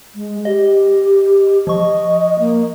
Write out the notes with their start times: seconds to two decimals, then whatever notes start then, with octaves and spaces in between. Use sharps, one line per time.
0.15 G#3
0.45 G4 D#5
1.67 F3 D#5 C#6
2.39 A#3